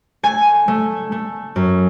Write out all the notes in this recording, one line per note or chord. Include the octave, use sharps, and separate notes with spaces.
A3 G#5
A3
A3
F#2